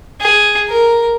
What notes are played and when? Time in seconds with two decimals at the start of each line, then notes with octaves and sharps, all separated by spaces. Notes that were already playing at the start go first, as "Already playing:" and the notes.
0.21 G#4
0.69 A#4